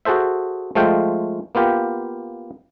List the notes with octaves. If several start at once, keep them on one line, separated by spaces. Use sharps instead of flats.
F#4 G#4 A4 C5 E5
F3 G#3 A3 F4 G5
A#3 B3 F4 G4